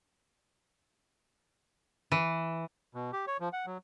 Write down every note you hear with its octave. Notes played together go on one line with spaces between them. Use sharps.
E3
B2
G4
C#5
F3
F#5
F#3